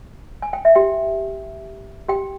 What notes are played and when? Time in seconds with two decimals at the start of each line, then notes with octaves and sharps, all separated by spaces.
0.42 G#5
0.53 G5
0.65 E5
0.75 G4 G5
2.09 G4 G5